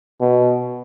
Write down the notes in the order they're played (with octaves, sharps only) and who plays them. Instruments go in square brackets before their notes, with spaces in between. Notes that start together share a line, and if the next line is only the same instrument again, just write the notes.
[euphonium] B2